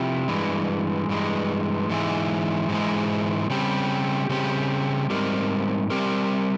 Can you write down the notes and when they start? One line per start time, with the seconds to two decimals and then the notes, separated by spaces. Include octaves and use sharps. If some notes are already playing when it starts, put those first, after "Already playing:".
Already playing: C3 F3 E4
0.28 G2 E3 G#3
1.09 G2 E3 G#3
1.90 G#2 E3 G#3
2.69 G#2 E3 G#3
3.50 C#3 G3 C4 G4
4.29 C#3 G3 C4 G4
5.10 G#2 G3 C4 G4 A#4
5.90 G3 C4 G4 A#4